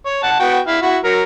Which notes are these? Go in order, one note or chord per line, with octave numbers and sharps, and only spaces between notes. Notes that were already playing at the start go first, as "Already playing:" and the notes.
C#5
F#5 A5
B3 F#4 G5
E4 F5
E4 F#4
F#3 A#4